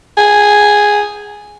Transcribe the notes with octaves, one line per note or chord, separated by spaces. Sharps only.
G#4